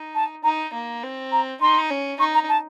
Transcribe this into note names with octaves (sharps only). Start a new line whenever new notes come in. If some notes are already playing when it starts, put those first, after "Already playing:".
Already playing: D#4
A5
D#4 A#5
A#3
C4
A#5
D#4 C6
C#4
D#4 C#6
A#5
A5